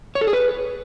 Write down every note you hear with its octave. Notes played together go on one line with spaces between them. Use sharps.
C#5
A4
G#4
B4